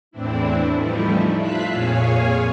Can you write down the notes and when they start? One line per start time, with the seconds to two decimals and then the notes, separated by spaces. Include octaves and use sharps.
0.11 E2 A2 E3 C4 D4 E4
0.75 E3 F3 G3 A3 D#4 E4
1.36 F4 E5 F5 A5 F#6 B6
1.71 F2 A#2 G#4 C#5 F5 G#5